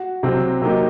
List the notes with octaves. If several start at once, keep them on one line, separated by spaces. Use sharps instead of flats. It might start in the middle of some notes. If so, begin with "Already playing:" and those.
Already playing: F#4
C2 C3 F#3 C4
C3 F#3 A#3 D#4 G4